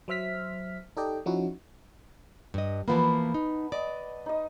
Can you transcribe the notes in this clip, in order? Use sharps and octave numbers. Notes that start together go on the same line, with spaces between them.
F#3 C5 E5 F6 B6
D#4 G4 A4 D5 D#5 G5
F3 C#4 D#4 E4 F#4
G2 D#5
E3 F3 A#3 B3 B4 A5
D#4
D5 D#5
D#4 D#5